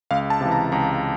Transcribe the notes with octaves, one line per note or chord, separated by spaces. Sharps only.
C#2 F5
A5
C3 E3
A#5
C#2 A#5